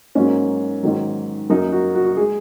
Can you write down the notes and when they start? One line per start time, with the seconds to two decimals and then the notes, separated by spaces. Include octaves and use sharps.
0.15 G#2 F#3 A#3 C#4
0.83 G#2 D#3 F#3
1.50 F#2 F#3 A#3 D#4
1.72 F#4
1.95 F#4
2.06 F#4
2.17 G#3 G#4